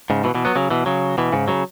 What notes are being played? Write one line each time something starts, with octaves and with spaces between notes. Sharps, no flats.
G#2 C#3
B2 E3
B2 E3
F#3 B3
C#3 F#3
B2 E3
C#3 F#3
B2 E3
G#2 C#3
C#3 F#3